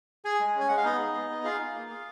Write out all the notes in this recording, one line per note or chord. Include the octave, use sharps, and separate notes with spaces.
G#4 G#5
G#3
C#4
G#5
G#3 F#5
F5
B3 D#4 D#5
G#4
B3
B3
F4 G#4 F5
D#4
A#3
G#4